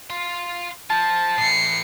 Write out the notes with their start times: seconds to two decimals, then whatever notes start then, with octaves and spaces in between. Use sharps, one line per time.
0.10 F5 C6
0.90 F4 C5 A5
1.38 A2 E3 C7 C#7